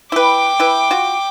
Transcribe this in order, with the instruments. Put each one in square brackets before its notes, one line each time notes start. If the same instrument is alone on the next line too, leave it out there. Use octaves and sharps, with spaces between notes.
[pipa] E4 B4 [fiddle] G5 D6
[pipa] E4 B4
F4 F#4